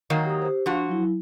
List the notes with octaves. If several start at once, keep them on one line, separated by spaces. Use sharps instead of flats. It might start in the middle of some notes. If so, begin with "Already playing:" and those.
D#3 F#3 A#3
G4 D#6
G4 C5
F3 D4 F4 F#4
F#3 E4